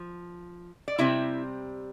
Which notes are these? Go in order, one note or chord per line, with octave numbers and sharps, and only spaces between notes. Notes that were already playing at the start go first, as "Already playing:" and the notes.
Already playing: F3
D5
C3 G3 C4 E4 E5